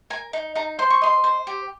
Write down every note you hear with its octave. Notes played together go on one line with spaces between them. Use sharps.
A#4 G#5
D#4
D#4 A#5
C5 C6
C#6
D#5 C6
C5
G4